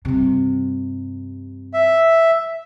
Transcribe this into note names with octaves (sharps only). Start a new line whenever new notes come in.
G2 C3
E5